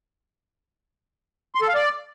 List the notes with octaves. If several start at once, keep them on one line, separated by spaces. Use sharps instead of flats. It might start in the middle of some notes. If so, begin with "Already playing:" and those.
C6
A4
F5
D5